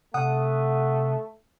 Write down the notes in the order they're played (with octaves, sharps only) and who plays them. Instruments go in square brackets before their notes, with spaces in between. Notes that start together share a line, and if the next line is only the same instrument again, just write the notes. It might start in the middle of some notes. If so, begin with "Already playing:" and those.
[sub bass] C3 [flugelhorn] A3 [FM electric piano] F#5 D#6